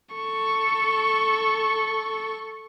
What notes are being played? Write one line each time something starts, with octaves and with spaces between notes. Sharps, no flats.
A4 C#6